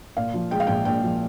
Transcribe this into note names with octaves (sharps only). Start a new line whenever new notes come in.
A#2 F5
F3
G#3 G5
F5
A#1 G5
A#2 G5
F3